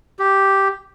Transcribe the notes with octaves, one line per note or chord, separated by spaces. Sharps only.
G4